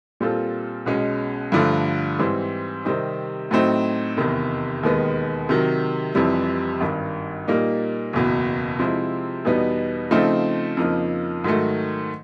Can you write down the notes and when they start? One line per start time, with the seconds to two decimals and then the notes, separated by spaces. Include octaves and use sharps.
0.20 A#2 G3 C4 F4 A4
0.86 B1 B2 G#3 C#4
1.52 G2 D3 F3 A3
2.19 G#2 E3 G3 C4
2.85 C3 D#3 G3 C4 D#4
3.51 A2 F#3 A3 C4 D#4
4.17 F1 E2 C3 D#3
4.83 E1 D#2 D#3 G#3 B3
5.49 C3 D#3 F#3
6.15 F1 F2 C3 E3 G3
6.81 G#1 G2 D#3
7.48 A#2 G3 A#3 D#4
8.13 F#1 E2 B2
8.79 C3 F3 G#3 C4 E4
9.45 E2 B2 G3 B3 D#4
10.11 C#3 F3 A3 C4 D#4
10.77 F2 C#3 F3 A#3 D#4
11.44 G#2 D#3 F#3 A3